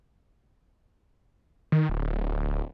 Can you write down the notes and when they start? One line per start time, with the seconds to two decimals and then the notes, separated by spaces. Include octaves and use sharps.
1.72 D#3
1.89 D1